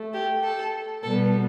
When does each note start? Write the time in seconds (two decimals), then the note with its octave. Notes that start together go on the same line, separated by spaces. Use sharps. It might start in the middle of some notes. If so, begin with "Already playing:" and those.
Already playing: A3
0.13 G4
0.44 A4
1.03 B2 G3 B3 A4